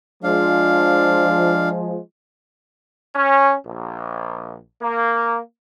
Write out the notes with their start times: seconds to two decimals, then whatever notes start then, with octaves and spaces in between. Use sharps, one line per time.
0.24 F3 G#3 D4 F5
3.15 C#4
3.66 A#1
4.82 A#3